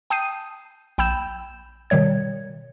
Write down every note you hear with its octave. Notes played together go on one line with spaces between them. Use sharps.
G5 A5 D#6 G6 C7 D#7
A#1 G5 B5 E6 G6 E7
B2 D#3 G3 C#5 G#6